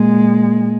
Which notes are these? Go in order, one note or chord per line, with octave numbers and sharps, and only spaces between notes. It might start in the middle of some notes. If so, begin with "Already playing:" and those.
Already playing: A#2 G#3